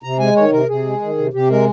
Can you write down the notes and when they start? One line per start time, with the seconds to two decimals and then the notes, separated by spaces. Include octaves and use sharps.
0.03 C3 A#5
0.19 G#3 G#5
0.36 D#3 C#5
0.52 C3 A#4
0.68 C3 G#4
0.85 G#3
1.02 D#3
1.18 C3
1.33 C3 G4
1.50 G#3 A#4